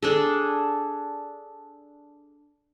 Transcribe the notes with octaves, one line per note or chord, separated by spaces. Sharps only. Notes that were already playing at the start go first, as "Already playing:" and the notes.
D4 G#4 A4